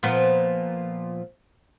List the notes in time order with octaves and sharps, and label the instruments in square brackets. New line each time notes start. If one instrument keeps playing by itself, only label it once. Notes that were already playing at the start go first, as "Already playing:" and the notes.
[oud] A#2 F3 B3